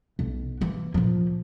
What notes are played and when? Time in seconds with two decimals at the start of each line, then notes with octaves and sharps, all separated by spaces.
0.19 B1
0.61 E3 A#3
0.94 A#2 F3